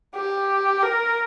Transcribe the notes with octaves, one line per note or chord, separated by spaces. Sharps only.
G4
A#4